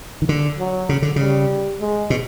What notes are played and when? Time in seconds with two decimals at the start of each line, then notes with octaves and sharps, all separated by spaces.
0.22 D#3
0.29 D3
0.59 F#3
0.89 C#3
1.02 D3
1.16 C#3 G3
1.81 G#3
2.10 B2